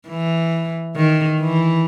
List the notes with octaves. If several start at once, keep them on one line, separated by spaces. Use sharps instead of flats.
E3
D#3
E3